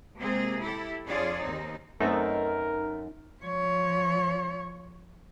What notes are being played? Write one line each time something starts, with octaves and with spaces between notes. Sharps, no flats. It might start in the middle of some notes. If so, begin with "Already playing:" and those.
C3 G#3 A#3 C4 G#4
E4 G4 A4
F2 D4 F4 G#4 C#5 D5
D#2 C4 D#4
F#2 A3 B3 C4 D#4 A4 A#4
F3 C#5